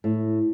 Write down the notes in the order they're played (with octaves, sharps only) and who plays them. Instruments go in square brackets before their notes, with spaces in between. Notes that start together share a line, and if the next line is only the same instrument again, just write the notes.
[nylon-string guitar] A2